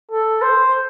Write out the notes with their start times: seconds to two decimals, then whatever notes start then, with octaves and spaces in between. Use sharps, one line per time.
0.11 A4
0.42 C5